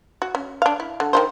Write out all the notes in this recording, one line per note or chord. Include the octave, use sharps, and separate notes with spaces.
F#4
C#4
D4 F5
E4
D3
D#3 G#3 C5